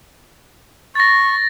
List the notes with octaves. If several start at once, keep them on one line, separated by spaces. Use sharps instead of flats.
C#6 A6 A#6